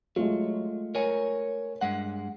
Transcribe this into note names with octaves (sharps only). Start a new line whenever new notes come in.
F#3 G#3 A3 F4
A#4 C#5 G#5
G2 G#3 F#5